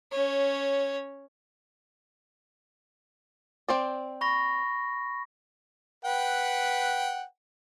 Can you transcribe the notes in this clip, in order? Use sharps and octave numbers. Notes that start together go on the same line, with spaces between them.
C#4 C#5
C4 C5 D5
B5 C#6 A#6
B4 F#5 G5